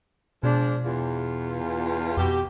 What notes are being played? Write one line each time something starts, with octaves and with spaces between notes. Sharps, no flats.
B2 F3 G#3 D4
E2 F4
F2 B2 G4